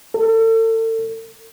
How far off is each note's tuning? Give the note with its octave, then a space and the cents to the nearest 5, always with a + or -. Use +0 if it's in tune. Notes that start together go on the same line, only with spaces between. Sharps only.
A4 +35